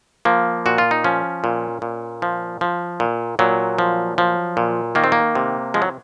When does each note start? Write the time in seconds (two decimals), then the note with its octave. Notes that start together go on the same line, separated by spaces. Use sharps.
0.25 F3 A#3
0.66 A#2 F#4
0.78 F4
0.91 D#4
1.04 F3 C#4
1.44 A#2
1.82 A#2
2.22 F3
2.61 F3
3.00 A#2
3.39 A#2 F#3
3.79 F3
4.18 F3
4.57 A#2
4.95 D#3 A#3
5.04 C4
5.12 A#3
5.35 C3
5.74 F3 G#3
5.82 F#3